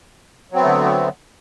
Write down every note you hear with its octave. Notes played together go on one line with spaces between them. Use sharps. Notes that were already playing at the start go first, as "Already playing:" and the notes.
D3 F#3 A3 B3 C4